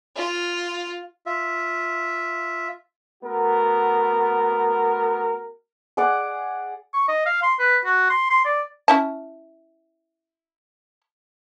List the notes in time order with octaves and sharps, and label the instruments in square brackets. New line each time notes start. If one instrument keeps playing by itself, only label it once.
[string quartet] F4
[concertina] F4 E5
[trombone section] A3 B3 F#4 A#4
[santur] G#4 D5 F#5 D6
[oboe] C#6
D#5
F5
C6
B4
F#4
C6
C6
D5
[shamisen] C#4 E4 A5